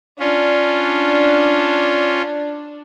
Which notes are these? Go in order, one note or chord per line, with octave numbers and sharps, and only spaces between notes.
C#4 D4 F4